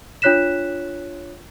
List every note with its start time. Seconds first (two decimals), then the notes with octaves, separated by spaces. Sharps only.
0.22 D4 F4 C#5 F#6 B6 E7